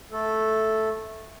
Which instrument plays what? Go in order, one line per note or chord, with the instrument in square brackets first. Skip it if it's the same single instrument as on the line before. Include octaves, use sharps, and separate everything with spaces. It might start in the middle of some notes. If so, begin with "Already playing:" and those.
[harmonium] A3 A4